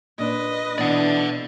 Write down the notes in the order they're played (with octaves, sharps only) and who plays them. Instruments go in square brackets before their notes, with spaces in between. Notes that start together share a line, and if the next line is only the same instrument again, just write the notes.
[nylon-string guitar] A#2 D4 [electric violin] B4 D#5
[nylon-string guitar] B2 [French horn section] E3 D4 [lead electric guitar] D5 F#5